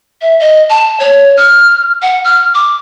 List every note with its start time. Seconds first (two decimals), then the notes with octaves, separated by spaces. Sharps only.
0.21 E5
0.40 D#5
0.70 A5
1.00 C#5
1.37 F6
2.02 F#5
2.24 F6
2.54 D6